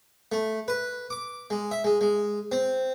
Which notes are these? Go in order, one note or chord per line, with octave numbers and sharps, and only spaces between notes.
A3
B4
D6
G#3
E5
G#3
G#3
C4